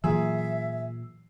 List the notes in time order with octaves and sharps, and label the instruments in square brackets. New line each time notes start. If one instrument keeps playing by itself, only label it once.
[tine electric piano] A#2 E6 [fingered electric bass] E3 F#3 [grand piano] G#4 [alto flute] E5